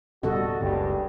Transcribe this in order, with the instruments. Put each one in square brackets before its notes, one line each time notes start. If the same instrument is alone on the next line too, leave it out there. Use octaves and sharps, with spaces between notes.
[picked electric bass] D1 B2 D3 [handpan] G3 A4 D#5 [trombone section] F#4
[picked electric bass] F#1 C#2 [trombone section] G2 C#3 G4